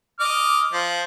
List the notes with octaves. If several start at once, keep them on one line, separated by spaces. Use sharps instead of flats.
D#5 D6 F6
F3